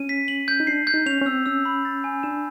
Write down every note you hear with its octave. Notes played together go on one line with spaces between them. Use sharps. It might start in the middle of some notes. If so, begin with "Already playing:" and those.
Already playing: C#4 D#7
B6
F#7
G6
D#4
D4 C7
G6
D#4
C#4 F7
C#4
C4 E6
C#4 E6
B5
A6
G#5
D4 E7